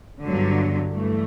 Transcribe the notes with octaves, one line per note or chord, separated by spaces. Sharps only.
G1 G2 D3 F#3
G2 E3 A3